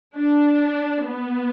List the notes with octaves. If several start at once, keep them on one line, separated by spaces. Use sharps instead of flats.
D4
B3